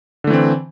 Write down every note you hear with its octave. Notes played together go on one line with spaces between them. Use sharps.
D3 E3 A3 C4